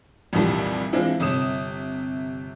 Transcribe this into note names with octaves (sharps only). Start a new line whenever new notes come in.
C2 F2 A#2 D#3 E3 G3
E3 G#3 C4 D4 E4 F4
G1 C3 D#6 E7